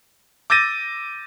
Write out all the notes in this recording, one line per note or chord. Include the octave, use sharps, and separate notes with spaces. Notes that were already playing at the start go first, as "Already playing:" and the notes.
D6 E6 G6 A6 A#6 D#7